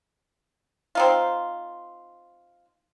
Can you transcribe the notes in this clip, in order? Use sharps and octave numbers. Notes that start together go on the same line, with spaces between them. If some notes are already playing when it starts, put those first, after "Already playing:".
C4 D#4 F4